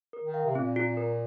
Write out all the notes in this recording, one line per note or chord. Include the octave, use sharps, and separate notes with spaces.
A#4
D#3
F5
C3
A#2 C4
F4
A#4